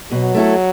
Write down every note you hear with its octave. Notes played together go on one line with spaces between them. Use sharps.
B2 F#3
A3 E4 A4